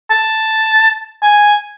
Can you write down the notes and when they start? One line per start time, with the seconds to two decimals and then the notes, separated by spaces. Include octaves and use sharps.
0.11 A5
1.23 G#5